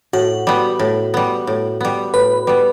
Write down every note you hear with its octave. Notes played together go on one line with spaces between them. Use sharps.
A2 F#4
G3 B3
A2
G3 B3
A2
G3 B3
A2 B4
G3 B3